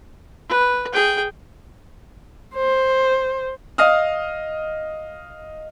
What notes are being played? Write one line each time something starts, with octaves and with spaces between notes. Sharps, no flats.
B4
G#4 G5
C5
D#5 F5 D#6 F6